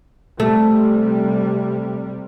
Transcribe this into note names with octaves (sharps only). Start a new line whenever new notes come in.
C3 G3 A3